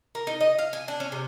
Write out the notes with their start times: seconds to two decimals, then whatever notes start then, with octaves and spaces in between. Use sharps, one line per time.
0.15 A#4
0.27 D#4
0.41 D#5
0.59 F5
0.73 G#5
0.88 D4
1.00 C#4
1.12 C3